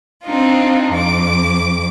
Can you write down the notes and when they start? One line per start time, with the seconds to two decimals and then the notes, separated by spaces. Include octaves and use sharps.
0.24 C4 D4 D#4 F4
0.91 F2 D6